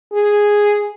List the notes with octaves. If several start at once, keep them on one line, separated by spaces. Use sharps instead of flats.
G#4